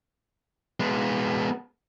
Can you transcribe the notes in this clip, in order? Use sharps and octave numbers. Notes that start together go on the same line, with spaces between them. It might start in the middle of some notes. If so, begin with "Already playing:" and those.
G#3 B3